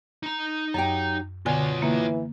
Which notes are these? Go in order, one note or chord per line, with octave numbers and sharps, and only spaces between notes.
D#4 A#5
F#2 F#3 G4 G5
B2 D3 F4 C#5 G#5
E3 A#3